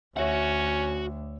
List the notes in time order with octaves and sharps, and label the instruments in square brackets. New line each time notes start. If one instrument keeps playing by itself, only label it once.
[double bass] D2 [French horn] C#4 [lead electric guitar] F#4 F#5 [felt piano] C#5 E5